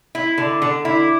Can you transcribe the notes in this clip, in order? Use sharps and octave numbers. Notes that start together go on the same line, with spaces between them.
E4
D3
D3
E4